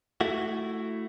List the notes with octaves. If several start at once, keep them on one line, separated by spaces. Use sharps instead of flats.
A3 E4 F#4